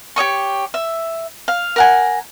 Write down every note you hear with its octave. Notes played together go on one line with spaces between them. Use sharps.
G4 C#5 D#5 C#6
E5
F5
A#4 F#5 G#5